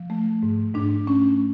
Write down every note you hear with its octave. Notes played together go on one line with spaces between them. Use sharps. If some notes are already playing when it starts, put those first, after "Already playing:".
Already playing: F3
A3
G#2
G#2 D4
A3 C#4